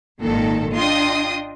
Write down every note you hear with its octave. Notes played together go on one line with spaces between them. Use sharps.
G#1 A#2 D#3 A4
D4 F4 D#5 G5 C6 D#6